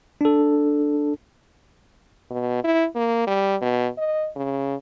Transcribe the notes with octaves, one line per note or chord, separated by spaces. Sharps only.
D4 A4
B2
E4
A#3
G3
B2
D#5
C#3